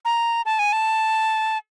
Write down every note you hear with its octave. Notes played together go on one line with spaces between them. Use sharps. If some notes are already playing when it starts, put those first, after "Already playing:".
A#5
A5
G#5
A5